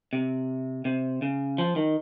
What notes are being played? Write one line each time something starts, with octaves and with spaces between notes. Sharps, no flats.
C3
C3
C#3
F3
D#3